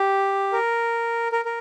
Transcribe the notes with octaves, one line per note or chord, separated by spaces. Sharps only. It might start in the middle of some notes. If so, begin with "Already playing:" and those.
Already playing: G4
A#4
A#4
A#4